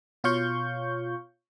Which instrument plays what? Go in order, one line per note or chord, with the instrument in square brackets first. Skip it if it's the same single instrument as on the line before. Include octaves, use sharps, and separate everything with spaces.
[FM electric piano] B2 F4 C#5 F5 C#6 G6